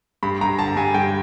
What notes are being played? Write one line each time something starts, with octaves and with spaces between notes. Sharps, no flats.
G2 B5
G2 A#5
D3 A5
G2 G#5
G2 G5